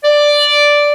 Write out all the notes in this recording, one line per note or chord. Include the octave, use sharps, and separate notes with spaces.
D5